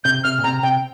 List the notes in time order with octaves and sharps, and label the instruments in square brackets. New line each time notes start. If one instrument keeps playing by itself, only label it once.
[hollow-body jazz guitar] C3 [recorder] G6
[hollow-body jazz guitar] C3 [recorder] F6
[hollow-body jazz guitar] A#2
[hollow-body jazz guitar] C3 [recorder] A#5
[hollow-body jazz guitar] C3 [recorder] G5